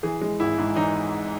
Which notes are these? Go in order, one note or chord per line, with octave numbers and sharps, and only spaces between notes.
E3 G#4
G#3
G#1 E4
G#2
E3 D#4